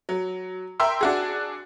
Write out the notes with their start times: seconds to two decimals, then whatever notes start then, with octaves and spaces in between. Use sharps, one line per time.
0.09 F#3
0.80 A#4 E5 G5 C6 E6
1.01 D4 F#4 G#4